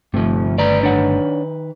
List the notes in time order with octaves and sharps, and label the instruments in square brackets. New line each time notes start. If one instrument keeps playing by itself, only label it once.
[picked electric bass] G1 A3 [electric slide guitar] C3 F3
[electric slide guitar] D#3 B4 A#5 [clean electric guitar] D5
[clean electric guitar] D4 C#5 F#5